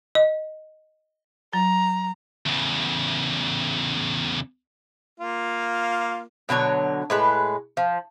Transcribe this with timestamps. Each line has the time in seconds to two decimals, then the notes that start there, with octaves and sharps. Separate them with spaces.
0.15 D#5
1.53 F#3 A#5
2.46 E2 C#3
5.20 A#3 F4
6.49 B2 D3 F#3 C#5
7.10 A2 G#3 B4
7.77 F3